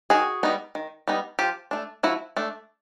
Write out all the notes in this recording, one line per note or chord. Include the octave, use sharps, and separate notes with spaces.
D#3 F#4 G#4
G3 B3 D#4
D#3
G3 B3 D#4
F3 F4 G4
A3 D4
F3 E4 F#4
A3 D4